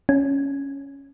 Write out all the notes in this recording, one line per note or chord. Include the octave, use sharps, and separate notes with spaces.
C#4